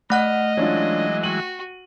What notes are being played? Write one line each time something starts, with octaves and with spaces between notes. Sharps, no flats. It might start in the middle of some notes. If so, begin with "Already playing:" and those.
A3 D#5 F#5 F6 F#6
E3 F#3 G#3 C#4 D4 F4
F#4 G5 D#7 F#7